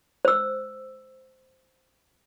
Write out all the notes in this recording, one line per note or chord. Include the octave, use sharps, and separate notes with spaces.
C5 E6